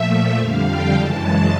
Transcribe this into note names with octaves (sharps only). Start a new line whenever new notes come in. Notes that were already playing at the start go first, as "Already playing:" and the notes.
Already playing: A#2 F3 A3 E5
F2 D3 G3 F5
G5
F#2 C#3 E3 G#3 A5